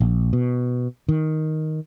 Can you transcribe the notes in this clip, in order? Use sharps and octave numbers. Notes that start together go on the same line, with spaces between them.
A#1
B2
D#3